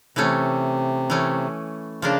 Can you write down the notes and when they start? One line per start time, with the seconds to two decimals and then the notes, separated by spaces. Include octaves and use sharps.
0.16 C3 E3 A3 C#4
1.10 E3 A3 C#4
2.02 C#3 F3 A#3 D4